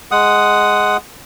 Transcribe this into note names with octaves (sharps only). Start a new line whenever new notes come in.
G#3 F#5 D#6